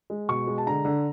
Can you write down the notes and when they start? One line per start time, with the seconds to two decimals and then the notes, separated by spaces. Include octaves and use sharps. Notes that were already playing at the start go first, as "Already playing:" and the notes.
0.10 G#3
0.29 B2 C#6
0.47 G#3
0.58 A5
0.67 D3 A#5
0.85 D3